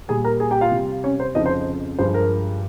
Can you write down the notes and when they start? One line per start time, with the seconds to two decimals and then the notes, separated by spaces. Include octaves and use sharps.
0.08 A#2 G3 G#4 G#5
0.25 A#4 A#5
0.40 G#4 G#5
0.51 G4 G5
0.61 F4 F5
0.71 C3 G3
1.04 C#4 C#5
1.20 C5
1.35 F2 C#3 F3 D#4 D#5
1.46 C5
1.99 G2 F3 G#3 C5
2.14 A#4